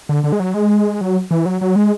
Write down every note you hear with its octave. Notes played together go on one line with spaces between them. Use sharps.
D3
D3
G#3
F#3
G#3
F#3
E3
F#3
F#3
G#3